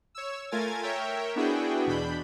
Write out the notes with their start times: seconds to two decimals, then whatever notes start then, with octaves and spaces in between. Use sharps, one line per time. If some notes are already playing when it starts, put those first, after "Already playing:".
0.15 C#5 E6
0.51 A3 F4 A#4 G#5 G#6 A6
0.82 A#4 C#5 E5 G5
1.36 B3 D4 E4 F#4 G#4 G5
1.86 E2 B2 D4 B5 G6